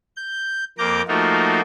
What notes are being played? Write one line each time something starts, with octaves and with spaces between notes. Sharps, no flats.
G6
F2 A#3 A#5 D6 G6
F3 A3 A#3 D#4 F4 F#4